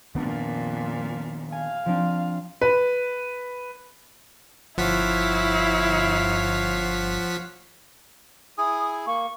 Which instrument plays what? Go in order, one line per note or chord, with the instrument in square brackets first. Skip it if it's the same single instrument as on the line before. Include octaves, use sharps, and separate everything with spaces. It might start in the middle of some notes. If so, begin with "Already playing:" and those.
[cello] F2 A#2 [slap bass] D#3 B3 D4
[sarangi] F5 [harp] G#5
[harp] F3 C4 D4
[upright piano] B4
[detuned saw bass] G1 [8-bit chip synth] F3 F#5 B6 [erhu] E4 [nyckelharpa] C#5 F5
[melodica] E4 G#4 G#5 [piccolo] D#6
[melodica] A#3 [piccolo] C#6